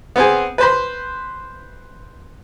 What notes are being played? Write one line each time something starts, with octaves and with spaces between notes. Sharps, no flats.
B3 C4 G#4
B4 C5 B5